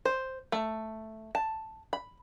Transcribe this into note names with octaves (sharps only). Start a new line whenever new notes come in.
C5
A3
A5
B5